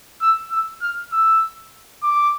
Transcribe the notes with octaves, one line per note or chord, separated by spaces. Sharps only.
E6
E6
F6
E6
D6